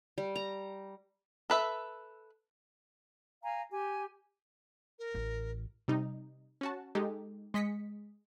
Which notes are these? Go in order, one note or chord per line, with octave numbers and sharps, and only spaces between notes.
G3
A#5
A4 B4 E5
F5 G#5 A#5
G4 G#5
A#4
A1
C3 G3 D#4
C#4 F#4 A5
G#3 D#4 G4 A4
G#3 D#5 B6 C#7